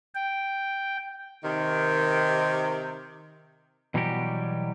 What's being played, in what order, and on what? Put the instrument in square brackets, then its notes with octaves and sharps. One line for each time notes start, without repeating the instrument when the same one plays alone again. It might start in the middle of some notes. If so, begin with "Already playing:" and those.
[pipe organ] G5
[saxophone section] C3 D#3
[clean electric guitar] B2 E3 F#3 G3 F#4 G4